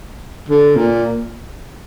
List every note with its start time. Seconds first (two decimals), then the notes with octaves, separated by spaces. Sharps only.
0.48 D3
0.76 A#2